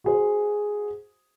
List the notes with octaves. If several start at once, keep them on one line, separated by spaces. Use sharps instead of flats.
F#4 G#4 C5